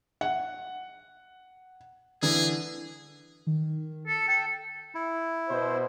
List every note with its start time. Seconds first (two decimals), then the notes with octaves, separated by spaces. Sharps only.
0.21 F#5
2.22 D3 E3 G#4
3.47 D#3
4.07 A4
4.28 A4 G5
4.95 E4
5.48 B2 C5